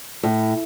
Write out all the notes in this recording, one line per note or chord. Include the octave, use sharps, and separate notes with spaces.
A2